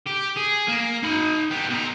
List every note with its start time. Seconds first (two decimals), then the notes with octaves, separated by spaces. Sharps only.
0.06 G4
0.36 G#4
0.68 A#3
1.03 D#4 B5
1.51 B3 G4
1.70 B2 A#5